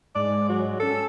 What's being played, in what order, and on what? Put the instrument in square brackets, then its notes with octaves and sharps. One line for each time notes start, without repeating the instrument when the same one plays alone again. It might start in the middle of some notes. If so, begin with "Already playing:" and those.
[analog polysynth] G#2 G#3 [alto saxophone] D5
[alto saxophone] F#3
[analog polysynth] C#4 E6 [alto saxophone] A4